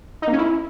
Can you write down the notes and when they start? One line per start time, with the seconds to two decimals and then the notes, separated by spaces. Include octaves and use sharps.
0.22 D#4
0.28 A#3
0.33 C#4
0.38 E4